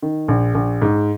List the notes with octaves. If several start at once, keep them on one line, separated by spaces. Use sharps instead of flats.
D#3
A#1
A#1
G#2